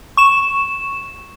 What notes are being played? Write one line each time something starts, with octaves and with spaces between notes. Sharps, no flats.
C#6 E7